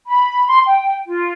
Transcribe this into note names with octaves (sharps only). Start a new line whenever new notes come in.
B5
C6
G5
F4